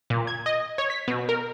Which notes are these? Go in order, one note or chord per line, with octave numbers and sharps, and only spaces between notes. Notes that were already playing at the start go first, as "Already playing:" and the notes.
A#2
G#6
D#5
C#5
B6
B2
A#4